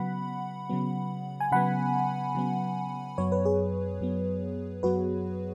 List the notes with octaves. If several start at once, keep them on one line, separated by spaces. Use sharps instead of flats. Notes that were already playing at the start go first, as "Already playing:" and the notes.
Already playing: C#3 F#3 B3 F#5 B5
C#3 F#3 B3
G#5
C#3 F#3 B3 F#5 B5
C#3 F#3 B3
F#2 F#3 B3 C#5
B4
G#4 C#5
F#2 F#3 B3
F#2 F#3 B3 F#4 B4